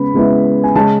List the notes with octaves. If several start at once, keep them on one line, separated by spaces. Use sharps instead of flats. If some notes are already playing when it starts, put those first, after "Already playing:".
Already playing: C#3 G#3 B3 B5
C#3 G#3 B3 E4
G#5
C#3 G#3 C#4 A5